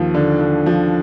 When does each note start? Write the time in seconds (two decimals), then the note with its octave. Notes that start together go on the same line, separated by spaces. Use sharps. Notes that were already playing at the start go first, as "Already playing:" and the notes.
Already playing: D#2 F3
0.14 D3
0.41 D3
0.66 F3